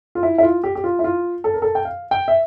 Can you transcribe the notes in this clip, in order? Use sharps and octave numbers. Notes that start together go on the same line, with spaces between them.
F4
E4
E4
F4
G4
G4
F4
E4
F4
A4
A#4
A4
G5
F5
G5
E5